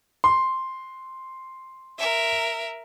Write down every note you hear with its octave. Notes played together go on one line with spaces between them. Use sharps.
C6
A#4 E5